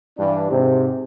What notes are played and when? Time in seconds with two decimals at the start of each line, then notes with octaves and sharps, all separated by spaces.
0.18 G2 E3 D4
0.50 G#2 C3